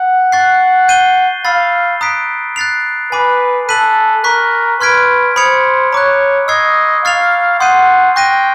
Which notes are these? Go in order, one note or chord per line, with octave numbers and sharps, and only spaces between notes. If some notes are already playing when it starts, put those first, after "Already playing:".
Already playing: F#5
C#6 F#6 A6 C7
G6 C7 D#7 G7
F5 B5 E6 A6 C7
A#5 D#6 F#6 B6 D7
F#6 A6 C7 F7
B4 G#5 B5 D6
A4 F#6 B6 D#7 F#7
A#4 C#6 F#6 B6
B4 C6 F6 G#6 B6 D7
C5 B5 D#6 G#6 C#7 F7
C#5 A#5 D6 F#6
D#5 C#6 E6 G#6 C7
F5 C#6 F6 A6 C7 F7
F#5 C6 D#6 G6 C7 D#7
G5 C#6 F#6 A#6 D#7